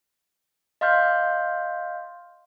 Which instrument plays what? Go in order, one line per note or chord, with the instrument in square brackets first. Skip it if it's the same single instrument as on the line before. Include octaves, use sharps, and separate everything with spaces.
[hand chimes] D#5 F5 C6 F6 G6